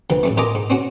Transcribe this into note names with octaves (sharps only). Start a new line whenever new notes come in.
D2 E3 F3
A1 F#2 A3
A1 F4 A#4 D#5 G#5 D6
G#2
C4 C#4 F#4